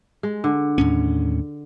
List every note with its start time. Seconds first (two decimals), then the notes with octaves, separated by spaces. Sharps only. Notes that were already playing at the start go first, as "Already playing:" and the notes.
0.23 G#3
0.44 D3
0.78 D#2 A2 C#4